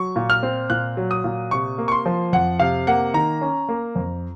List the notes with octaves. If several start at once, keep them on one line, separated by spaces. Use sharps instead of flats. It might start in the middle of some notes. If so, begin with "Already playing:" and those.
Already playing: F#3 C#6
A#2
F6
C4
A#2 F#6
F#3
D#6
A#2
C3 C#6
A#3
C#6
C6
F3
F2 F#5
C3 F5
A#3 F#5
D#3 A#5
C#4
A#3
F2